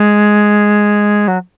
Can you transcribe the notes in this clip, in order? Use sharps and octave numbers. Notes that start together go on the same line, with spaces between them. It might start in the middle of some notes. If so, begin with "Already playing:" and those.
Already playing: G#3
F#3